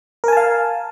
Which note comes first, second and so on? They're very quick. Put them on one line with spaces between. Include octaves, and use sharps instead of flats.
A#4 G#5 A5 F5